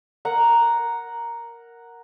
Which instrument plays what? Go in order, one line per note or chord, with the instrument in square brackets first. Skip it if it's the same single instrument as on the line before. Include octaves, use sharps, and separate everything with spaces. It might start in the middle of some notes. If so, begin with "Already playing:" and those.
[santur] A#4 F#5